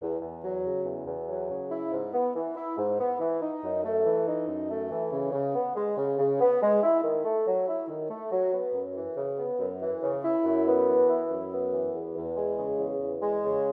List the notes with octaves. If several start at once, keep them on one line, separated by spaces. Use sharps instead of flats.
E2
E2
F#3
C#3
E2
E2
F#3
C#3
E4
G#2
B3
E3
E4
G#2
B3
E3
D#4
F#2
A3
E3
D#4
F#2
A3
E3
C#3
C#3
B3
G#3
C#3
C#3
B3
G#3
E4
D#3
A3
F#3
E4
D#3
A3
F#3
B3
F#2
E3
C#3
B3
F#2
E3
C#3
E4
F#2
B3
E3
E4
F#2
B3
E3
E2
E2
G#3
C#3
E2
E2
G#3
C#3